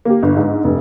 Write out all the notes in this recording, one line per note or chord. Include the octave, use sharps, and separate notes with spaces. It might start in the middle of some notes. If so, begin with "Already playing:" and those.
A#3 G4
G1
G#2
F1 G2